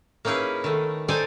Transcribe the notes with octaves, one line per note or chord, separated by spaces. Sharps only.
A#3 C#4 D#4 E4 G#4 B4
D#3 A3
D#4 A4 C5 D5 G5 G#5